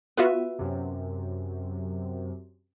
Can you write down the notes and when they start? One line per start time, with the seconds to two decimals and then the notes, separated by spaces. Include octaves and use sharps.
0.17 B3 F4 F#4 B4 E5
0.59 F#2 C3